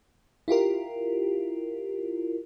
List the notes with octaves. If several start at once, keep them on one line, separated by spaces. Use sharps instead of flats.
E4 F4 G4 A#4